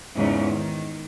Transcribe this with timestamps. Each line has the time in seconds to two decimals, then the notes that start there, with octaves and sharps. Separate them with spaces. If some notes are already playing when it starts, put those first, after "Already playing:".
0.16 E2 G#2 C#3 C#4
0.52 D#3